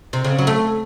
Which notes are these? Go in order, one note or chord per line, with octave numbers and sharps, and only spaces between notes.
C3
C#3
F#3
A3